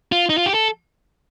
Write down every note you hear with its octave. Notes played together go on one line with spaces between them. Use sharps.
F4
D#4
F4
G4
A4